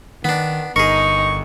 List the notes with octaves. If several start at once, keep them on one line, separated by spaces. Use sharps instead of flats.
D#3 B3 D4
G1 D#4 G#4 A#4 C#6